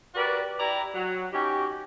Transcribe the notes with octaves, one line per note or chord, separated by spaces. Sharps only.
F#4 G4 A#4 B4 D5
E4 G4 D5 A#5
F#3
C#4 D#4 F#4 G4